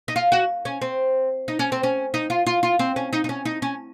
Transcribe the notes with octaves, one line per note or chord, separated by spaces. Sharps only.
D#4
F4
F#4
C#4
C4
D#4
C#4
C4
C#4
D#4
F4
F4
F4
C4
C#4
D#4
D#4
C#4
D#4
C#4